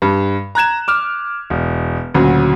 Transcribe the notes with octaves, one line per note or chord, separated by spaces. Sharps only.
G2
A#5 F#6 G#6 E7
D6 F6
E1
D2 A#2 C#3 F#3